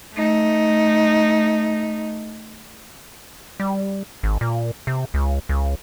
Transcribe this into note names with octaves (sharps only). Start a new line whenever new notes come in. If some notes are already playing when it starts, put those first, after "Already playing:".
A3 D#4
G3
G#1
A#2
C3
C#2
C#2